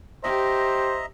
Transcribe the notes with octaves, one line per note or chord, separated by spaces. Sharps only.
G4 C5 D#5 E5 A#5